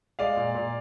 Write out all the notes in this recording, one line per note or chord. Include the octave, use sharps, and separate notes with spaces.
G#3 D5 F5
A#2
A#2